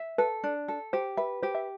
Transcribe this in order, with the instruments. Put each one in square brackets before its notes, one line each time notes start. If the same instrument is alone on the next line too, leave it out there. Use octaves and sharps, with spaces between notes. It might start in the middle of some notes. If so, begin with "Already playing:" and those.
Already playing: [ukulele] E5
[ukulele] A4 [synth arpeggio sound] B4
[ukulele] D4
A4
[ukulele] G4 [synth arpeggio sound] C5
[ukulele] B4 [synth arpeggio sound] E5
[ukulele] G4 [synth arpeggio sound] C5
[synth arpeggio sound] E5